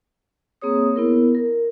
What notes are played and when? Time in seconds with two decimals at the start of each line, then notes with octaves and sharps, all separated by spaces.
0.62 A#3 C4 G#4 C#5 D#6
0.96 B3 E4 A#4
1.35 A#4